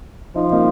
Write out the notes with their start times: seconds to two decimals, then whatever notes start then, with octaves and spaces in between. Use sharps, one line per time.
0.35 F3 D#4
0.52 A#3 D#4